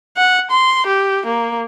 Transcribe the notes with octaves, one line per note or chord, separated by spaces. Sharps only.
F#5
C6
G4
A#3